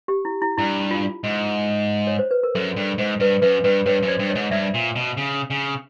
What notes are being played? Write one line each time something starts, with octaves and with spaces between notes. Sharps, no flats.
G4
E4
E4
G2 E4
F4
G#2
C#5
C5
B4
A#4
F#2 A4
G2
G#2 C5
G2 B4
F#2 B4
G2 B4
G2 B4 C#5
F#2
C5 D5
G2
C#5 D#5
G#2
G2 D5 E5
A#2
B2
C#3
C#3